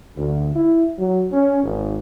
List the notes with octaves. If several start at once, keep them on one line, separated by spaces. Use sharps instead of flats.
D2
E4
F#3
C#4
G#1